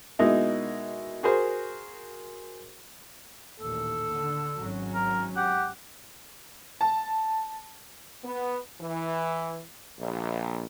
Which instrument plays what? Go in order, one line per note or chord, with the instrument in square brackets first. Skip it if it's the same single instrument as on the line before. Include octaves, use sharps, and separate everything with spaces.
[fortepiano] B2 G#3 A#3 D#4 E4
F#4 G#4 A#4 C5
[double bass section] A1 D#2 A#2 [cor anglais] A4
[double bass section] D3
G#1 F#3 C#4
[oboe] A#4
[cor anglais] G4 [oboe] F#5
[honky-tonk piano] A5
[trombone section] B3
E3
A#1